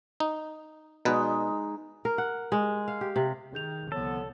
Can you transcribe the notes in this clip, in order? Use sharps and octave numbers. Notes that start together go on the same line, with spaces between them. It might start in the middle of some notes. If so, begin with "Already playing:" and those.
D#4
B2 G#3 D#4 B4
A#4
F#5
G#3
F5
G4
C3
D#3 G#4 G6 F7
C2 D3 F3 B3 A4 C#5